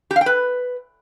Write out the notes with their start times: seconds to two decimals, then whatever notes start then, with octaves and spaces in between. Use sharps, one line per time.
0.11 G4
0.16 F5
0.21 G5
0.26 B4